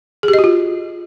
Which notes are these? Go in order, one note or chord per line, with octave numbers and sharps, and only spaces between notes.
G#4
G4
D#5
F#4
F4